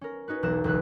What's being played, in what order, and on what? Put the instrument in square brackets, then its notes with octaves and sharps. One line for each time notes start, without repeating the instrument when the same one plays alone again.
[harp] C#4 A#4
C#4 D#4 F#4 B4
E1 B1 A#5 F#6 E7
E1 C#2 E4 B4 F#6